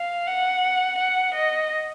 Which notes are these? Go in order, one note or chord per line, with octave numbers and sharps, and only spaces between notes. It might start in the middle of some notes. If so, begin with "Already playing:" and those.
Already playing: F5
F#5
F#5
D#5